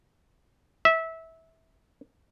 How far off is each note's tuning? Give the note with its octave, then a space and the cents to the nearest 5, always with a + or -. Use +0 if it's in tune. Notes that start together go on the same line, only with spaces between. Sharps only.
E5 -20